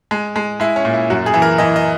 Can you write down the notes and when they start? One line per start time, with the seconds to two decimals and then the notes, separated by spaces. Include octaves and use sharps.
0.11 G#3
0.36 G#3
0.60 G#3 E4
0.76 C#4
0.85 A#2
0.94 E4
1.10 F#2 F#4
1.26 G#4
1.34 E3
1.42 A#4
1.58 E3 D#5
1.76 D#5